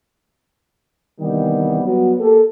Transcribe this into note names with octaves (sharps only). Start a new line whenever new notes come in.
C3 D#3 E3 G3 B3
F#3 G3 B3 F#4
A#3 G4 A4